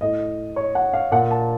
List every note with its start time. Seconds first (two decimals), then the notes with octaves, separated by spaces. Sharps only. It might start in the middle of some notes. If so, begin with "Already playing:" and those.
0.01 A2 D#5
0.56 C#5
0.75 F#5
0.93 F5
1.11 A#2 F#5
1.31 A5